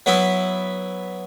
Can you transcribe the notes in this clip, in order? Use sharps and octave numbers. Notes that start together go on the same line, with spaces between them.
F#3 B3 E4